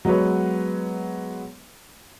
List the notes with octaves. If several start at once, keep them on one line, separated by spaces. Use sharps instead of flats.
F#3 G#3 B3 B4 C#5